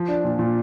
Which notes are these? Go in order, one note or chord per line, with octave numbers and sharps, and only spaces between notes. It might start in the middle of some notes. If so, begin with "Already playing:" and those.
Already playing: F3
D4
A#2
A#2